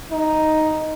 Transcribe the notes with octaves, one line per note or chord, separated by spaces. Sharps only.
D#4